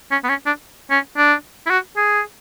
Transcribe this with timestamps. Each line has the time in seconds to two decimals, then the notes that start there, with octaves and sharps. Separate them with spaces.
0.11 C#4
0.24 B3
0.29 C#4
0.46 D4
0.91 C#4
1.17 D4
1.66 E4
1.70 F#4
1.97 G#4